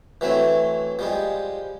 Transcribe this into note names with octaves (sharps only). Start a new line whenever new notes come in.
E3 F#3 A3 C4
F3 G3 G#3